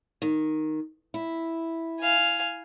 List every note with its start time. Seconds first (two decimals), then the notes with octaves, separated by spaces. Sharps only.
0.22 D#3
1.14 E4
2.00 F5 G#5